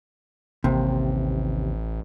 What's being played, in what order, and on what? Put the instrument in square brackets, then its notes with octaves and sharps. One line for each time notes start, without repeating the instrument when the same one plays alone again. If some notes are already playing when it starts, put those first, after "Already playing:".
[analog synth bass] A1 [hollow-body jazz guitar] D#2 C3